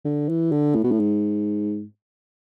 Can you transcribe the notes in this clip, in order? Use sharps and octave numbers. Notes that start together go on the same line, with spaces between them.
D3
E3
D3
A2
B2
A2
G#2